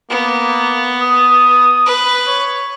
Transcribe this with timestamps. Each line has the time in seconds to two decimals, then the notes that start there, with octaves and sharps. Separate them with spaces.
0.10 A#3 B3
1.02 D#6
1.86 B4
2.27 C#5